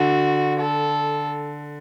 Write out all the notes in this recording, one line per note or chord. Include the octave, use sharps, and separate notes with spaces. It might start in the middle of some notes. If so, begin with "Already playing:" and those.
Already playing: D3 F#4
A4